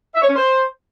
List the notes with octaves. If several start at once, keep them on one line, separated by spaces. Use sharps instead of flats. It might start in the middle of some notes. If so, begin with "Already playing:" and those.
E5
C#5
C#4
C5